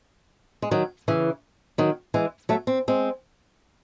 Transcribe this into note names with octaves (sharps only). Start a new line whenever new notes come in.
G#3
D#3 F#3
C#3 E3
D#3 F#3
E3 G#3
F#3 A3
C4
G#3 C4